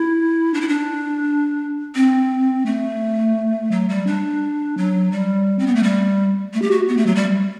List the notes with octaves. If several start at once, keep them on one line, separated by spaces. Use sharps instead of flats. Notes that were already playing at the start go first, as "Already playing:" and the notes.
Already playing: E4
D4
E4
D4
C4
A3
F#3
G3
D4
F#3
G3
C4
B3
A3
G3
A3
G4
F#4
B3
A3
F#3
G3